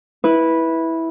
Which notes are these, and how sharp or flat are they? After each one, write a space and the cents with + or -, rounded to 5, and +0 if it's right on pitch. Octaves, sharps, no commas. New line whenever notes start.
E4 -10 B4 -10